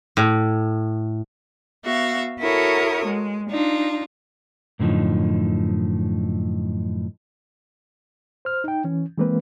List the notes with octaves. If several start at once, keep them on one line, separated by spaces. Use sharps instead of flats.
A2
B3 F#4 E5 F5
E4 F#4 A4 A#4 C#5 D#6
G#3
D4 D#4 F4
F#2 A2 D3 F3 D#4
C5 F6
D#4 G5
E3 C#4
E3 G#3 A#3 C4 B4